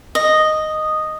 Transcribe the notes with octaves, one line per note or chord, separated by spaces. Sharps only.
D#5